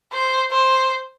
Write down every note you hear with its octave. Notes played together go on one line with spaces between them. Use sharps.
C5
C5